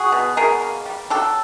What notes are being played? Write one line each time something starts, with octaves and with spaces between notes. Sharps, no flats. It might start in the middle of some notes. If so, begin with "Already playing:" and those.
Already playing: F#4 G#4
B2
B2 G#4 A#4
A#3
G3
F#3 G4 A4